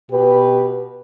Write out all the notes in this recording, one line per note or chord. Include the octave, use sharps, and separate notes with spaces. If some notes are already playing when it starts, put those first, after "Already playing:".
B2 G4 B4